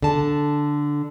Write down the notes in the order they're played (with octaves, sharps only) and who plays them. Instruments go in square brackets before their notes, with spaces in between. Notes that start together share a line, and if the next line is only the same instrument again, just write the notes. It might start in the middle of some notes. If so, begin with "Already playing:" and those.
[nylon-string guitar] D3 A5